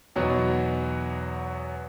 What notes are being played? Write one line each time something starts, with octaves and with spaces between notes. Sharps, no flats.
E2 B2 F#3 B3 D#4